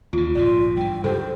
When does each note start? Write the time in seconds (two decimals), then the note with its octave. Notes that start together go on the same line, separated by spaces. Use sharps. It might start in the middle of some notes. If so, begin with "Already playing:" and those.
0.13 D#2 C#3 F4
0.35 A#1 G#2 B2 F4 D5
0.77 G2 E3 G5
1.04 G2 C#3 F#3 G4 A4 C5